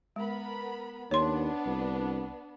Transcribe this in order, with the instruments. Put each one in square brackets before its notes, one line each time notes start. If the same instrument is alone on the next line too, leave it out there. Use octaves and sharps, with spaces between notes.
[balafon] G#3 [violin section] B3 A#4 B5
[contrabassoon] D#2 [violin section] B3 D4 [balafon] C#5 C6
[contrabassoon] C2